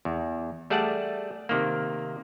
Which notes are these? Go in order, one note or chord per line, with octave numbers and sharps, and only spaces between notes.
E2
G3 A3 G#4 D5 F#5 A5
C3 D#3 A#3